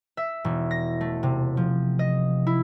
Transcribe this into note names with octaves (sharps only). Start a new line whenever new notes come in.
E5
E1
A#6
A3
C3
F3
D#5
E4